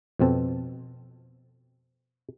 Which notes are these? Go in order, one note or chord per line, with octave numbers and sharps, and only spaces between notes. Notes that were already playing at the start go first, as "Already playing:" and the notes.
F2 B2 C4 A4